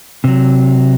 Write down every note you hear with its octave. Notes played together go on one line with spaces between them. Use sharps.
C3 F#3